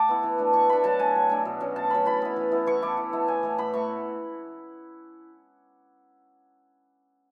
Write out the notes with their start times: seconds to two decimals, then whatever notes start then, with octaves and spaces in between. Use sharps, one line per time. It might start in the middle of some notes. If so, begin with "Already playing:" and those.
Already playing: A3 F#5 A5 D6
0.08 B3 E4
0.23 E3
0.38 A3 D4
0.53 E3 C#6
0.69 A3 D4 B5
0.84 F#3 A5
0.99 A3 D4 G#5
1.15 F#3
1.30 A3 D4
1.45 B2
1.61 F#3 C#4
1.76 B2 A5
1.90 F#3 C#4 B5
2.05 E3 B5
2.22 B3 E4
2.36 E3
2.51 B3 E4
2.67 E3 C#6
2.82 A3 E4 D6
2.97 E3
3.13 A3 E4
3.27 A2 G#5
3.43 E3 A3
3.58 A2 B5
3.73 E3 A3 C#6